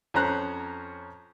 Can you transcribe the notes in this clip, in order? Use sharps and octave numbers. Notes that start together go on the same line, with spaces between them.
F2 C#4 C5 A#5 F#6